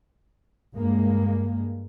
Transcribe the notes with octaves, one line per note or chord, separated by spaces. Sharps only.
G2 G#3 A#3